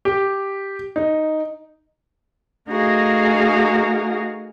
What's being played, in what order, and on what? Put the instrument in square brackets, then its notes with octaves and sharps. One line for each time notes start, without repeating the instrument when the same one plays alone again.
[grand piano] G4
D#4
[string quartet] A3 D#4 F#4 G#4 A#4 F5